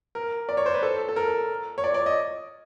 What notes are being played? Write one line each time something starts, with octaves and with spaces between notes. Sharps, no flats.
A#4
D5
C#5
C5
B4
A4
A4
A#4
C#5
D5
D5
D#5